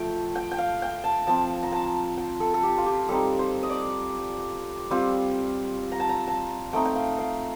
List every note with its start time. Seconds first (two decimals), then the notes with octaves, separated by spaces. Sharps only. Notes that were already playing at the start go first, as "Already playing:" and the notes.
Already playing: F3 A3 G5
0.35 G5
0.51 G5
0.58 F5
0.82 G5
1.04 A5
1.27 F3 C4 F4 A5
1.63 A#5
1.72 A5
2.17 G5
2.40 A4
2.54 A4
2.63 G4
2.78 F4
2.86 G4
3.08 G3 C4 D#4 A4
3.39 C5
3.63 D#5
3.69 D5
4.90 G3 C4 F4
5.92 A#5
6.00 A5
6.09 A#5
6.27 A5
6.73 A3 C4 D#4 G5
6.85 G5
6.95 F5
7.18 F5